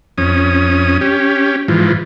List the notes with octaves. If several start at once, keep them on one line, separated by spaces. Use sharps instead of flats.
F2 C#4 D#6
C#4 G4
G#2 E3 F3